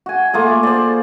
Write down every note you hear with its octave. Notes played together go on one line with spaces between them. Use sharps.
F#4 G#5
A3 A#3 F4 G#4
C5 D5